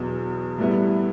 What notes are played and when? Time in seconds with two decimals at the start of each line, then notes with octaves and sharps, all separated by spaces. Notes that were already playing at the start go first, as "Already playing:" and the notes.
Already playing: E2 B2 F#3
0.58 A2 G3 B3 E4